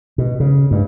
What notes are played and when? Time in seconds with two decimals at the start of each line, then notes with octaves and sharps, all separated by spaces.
0.18 B2
0.40 C#3
0.71 G2